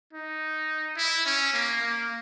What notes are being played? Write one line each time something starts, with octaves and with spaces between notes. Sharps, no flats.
D#4
E4
C#4
A#3
A#3